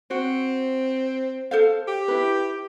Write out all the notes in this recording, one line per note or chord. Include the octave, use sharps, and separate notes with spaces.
C4 F#4
A4 C5 F5
G4
E4 B4